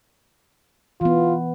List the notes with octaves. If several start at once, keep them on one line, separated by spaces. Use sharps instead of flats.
E3 B3 F4